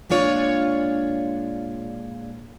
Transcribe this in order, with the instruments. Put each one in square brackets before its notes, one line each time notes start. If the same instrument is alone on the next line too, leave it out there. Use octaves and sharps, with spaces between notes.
[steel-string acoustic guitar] A#2 G#3 D4 F4 C#5